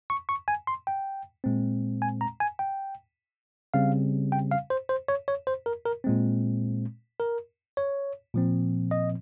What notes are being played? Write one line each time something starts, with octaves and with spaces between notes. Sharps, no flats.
C#6
C#6
G#5
C6
G5
A#2 G#3 C4
G#5
A#5
G#5
G5
C#3 G3 C4 F5
G5
F5
C5
C5
C#5
C#5
C5
A#4
A#4
A#2 G#3 C4
A#4
C#5
A#2 F3 C4
D#5